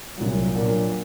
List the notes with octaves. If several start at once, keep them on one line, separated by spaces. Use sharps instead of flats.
C2 A#2 F#3
A#2 F#3 A#3 D4